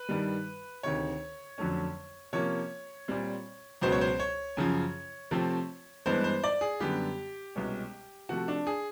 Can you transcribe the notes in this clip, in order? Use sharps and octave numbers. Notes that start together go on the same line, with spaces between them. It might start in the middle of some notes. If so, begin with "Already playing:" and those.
Already playing: B4
G2 D#3 G3
D2 C3 D#3 C#5
F2 D3 F#3 A3 C#4
C3 F3 A#3 C#4 C#5
A#2 G3 C4
C#2 B2 F#3 B3 C5
C#5
C5
C#5
F#2 C#3 F3
C3 F3 A3 C4
G2 E3 G#3 B3 C5
C5
D5
G#4
F#2 D3 G3 B3 G4
C2 B2 G#3 C#4
C3 F3 A3 F#4
D4
G#4